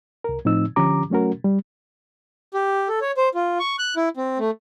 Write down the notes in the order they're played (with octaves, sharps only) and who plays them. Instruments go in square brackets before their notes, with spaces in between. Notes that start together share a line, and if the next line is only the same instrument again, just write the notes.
[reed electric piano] C2 A#4
A2 F3 C4 D#4 E6
D3 F3 C#4 G4 A#5 D6
F#3 A3 C#4 F#4 A#4
G3
[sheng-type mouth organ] G4
A4
C#5
C5
F4
C#6
F#6
E4
C4
A3